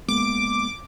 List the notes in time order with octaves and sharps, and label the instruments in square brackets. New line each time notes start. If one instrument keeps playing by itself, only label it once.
[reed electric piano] G#3 A#3 B3 [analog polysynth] D6